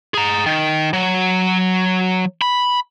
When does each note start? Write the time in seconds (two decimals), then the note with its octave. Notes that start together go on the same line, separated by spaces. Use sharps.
0.14 G#4 A#5
0.46 D#3
0.93 F#3
2.42 B5